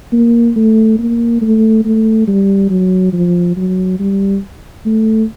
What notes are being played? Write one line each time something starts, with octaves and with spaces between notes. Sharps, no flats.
A#3
A3
A#3
A3
A3
G3
F#3
F3
F#3
G3
A3